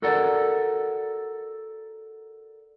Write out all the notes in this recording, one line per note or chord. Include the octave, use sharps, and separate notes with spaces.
F#4 A4 A#4 D5 F#5